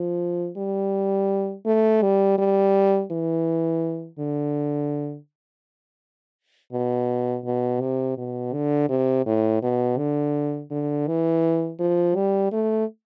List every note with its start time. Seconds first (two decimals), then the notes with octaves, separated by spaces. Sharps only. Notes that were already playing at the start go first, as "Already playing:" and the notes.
Already playing: F3
0.57 G3
1.66 A3
2.02 G3
2.38 G3
3.11 E3
4.19 D3
6.73 B2
7.45 B2
7.81 C3
8.18 B2
8.53 D3
8.89 C3
9.26 A2
9.63 B2
9.98 D3
10.71 D3
11.07 E3
11.80 F3
12.16 G3
12.52 A3